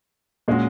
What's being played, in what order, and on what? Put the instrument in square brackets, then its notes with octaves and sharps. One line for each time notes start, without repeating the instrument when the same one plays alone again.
[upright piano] A#2 [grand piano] G#3 C#4 F#4